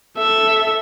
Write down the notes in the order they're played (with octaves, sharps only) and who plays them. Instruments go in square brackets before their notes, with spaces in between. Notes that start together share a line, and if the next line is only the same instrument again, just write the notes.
[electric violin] A4 E5